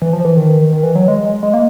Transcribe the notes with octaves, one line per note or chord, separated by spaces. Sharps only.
E3
F3
E3
D#3
D#3
E3
F#3
G#3
G#3
A#3